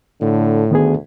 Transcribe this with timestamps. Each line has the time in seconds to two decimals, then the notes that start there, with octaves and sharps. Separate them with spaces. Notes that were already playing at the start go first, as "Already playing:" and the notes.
0.21 A2 D3
0.71 D2 D#3 B3 G#4